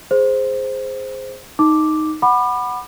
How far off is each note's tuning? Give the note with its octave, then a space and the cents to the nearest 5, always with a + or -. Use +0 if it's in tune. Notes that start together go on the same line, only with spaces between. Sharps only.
G#4 +0 C5 +0
D#4 +0 D6 +0
F#5 +0 B5 +0 D6 +40